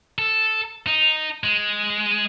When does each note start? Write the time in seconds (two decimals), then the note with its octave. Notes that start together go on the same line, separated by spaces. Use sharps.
0.18 A4
0.87 D#4
1.44 G#3